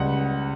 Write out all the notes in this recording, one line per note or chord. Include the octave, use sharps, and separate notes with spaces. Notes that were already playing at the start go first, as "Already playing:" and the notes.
Already playing: C#2 G3 F#5